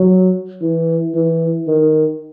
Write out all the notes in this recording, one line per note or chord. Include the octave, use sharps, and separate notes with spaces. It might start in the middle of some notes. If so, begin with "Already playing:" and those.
Already playing: F#3
E3
E3
D#3